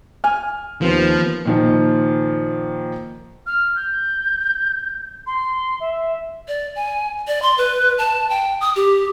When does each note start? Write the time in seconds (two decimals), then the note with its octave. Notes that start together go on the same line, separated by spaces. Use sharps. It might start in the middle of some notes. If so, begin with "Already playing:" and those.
0.24 G#5 F6
0.82 D#2 F3 B3 C4 B4
1.45 A#2 D#3 F3
3.46 F6
3.76 G6
5.27 C6
5.80 E5
6.48 D5
6.76 G#5
7.28 D5
7.42 C6
7.58 B4
7.99 A5
8.30 G5
8.61 D#6
8.76 G4